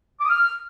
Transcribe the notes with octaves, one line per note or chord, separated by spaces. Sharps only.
D6
D#6
F6